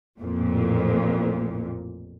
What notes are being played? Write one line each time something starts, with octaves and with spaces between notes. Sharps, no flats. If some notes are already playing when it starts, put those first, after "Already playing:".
A1 F2 A#2